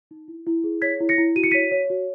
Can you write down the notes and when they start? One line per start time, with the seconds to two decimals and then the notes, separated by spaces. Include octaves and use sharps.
0.11 D#4
0.28 E4
0.47 E4
0.64 G#4
0.82 C#5 G#6 B6
1.00 E4
1.09 A#6 C#7
1.18 E4
1.36 F#4 D#7
1.44 C#7
1.51 C#5 B6 D#7
1.71 C#5
1.90 F#4